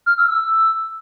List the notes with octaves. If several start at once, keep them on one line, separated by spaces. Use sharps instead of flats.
F6
E6
E6